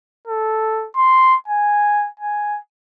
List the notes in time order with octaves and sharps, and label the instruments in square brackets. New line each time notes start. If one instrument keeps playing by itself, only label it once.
[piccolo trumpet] A4
C6
G#5
G#5